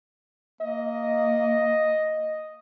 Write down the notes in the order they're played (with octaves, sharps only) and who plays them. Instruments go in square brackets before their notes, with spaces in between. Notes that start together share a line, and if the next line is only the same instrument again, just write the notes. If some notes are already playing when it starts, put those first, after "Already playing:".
[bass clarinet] A#3 [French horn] D#5